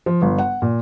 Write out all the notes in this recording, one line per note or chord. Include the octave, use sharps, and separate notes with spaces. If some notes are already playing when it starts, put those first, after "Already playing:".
F3
G1
F#5
A#2